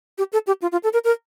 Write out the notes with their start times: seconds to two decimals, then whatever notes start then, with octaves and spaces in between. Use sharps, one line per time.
0.18 G4
0.33 A4
0.47 G4
0.62 F4
0.72 F4
0.84 A4
0.93 A#4
1.04 A#4